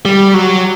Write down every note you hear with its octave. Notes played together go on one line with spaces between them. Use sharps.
G3
F#3